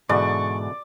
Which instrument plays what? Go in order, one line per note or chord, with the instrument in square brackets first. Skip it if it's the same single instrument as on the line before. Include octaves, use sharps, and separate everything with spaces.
[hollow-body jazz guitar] G#2 [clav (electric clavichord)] B2 D3 E3 [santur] D5 [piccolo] C#6